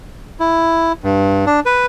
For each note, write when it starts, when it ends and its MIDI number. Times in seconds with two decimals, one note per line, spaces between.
0.40 0.92 64
1.03 1.45 43
1.46 1.60 62
1.66 1.86 71